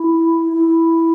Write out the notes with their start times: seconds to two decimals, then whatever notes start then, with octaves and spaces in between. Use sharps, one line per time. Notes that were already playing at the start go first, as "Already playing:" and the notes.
Already playing: E4
0.52 E4